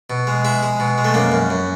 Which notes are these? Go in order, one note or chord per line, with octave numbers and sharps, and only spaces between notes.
B2
G#3
G#3 E4
G#3
B2
G#3
A3
F#2 A#3
F#2
F#2